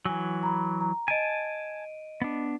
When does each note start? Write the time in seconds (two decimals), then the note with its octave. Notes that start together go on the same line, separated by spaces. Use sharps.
0.05 E3 F#3 G#5
0.43 A#5 B5
0.81 A#5
1.08 D#5 G#5 A5 D7 D#7
2.22 B3 D4